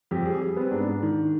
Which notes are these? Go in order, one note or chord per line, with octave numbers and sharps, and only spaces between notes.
F2 G4
G3 G#4
G3 G#4
B3 C4
G#2 D4
G#2
D#3